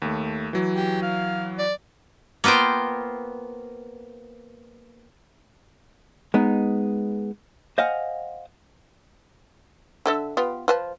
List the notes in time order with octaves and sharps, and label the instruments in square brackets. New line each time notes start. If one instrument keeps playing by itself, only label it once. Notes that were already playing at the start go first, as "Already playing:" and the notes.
[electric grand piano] D#2 A3
E3 F#3
[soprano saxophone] G4
F5
D5
[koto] A#3 B3 F4 C5 G5
[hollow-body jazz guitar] G#3 B3 D#4
C5 D#5 F5 F#5 G#5
[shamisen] D3 A4 E5
B3 F4 G4
F3 B4 A5